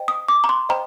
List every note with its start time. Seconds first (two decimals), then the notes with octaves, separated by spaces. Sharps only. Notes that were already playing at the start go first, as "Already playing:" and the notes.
Already playing: C5 D#5 G5
0.08 D#6
0.28 D6
0.44 A#5
0.49 C6
0.69 C5 D#5 G5 A#5